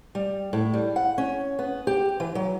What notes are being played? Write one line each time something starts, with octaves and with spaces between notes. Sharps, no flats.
G3
A2
G3
F#5
C#4
B3
G4
E3
F#3